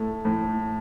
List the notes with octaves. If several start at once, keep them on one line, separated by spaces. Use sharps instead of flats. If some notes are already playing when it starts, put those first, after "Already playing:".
Already playing: A2 A3
A2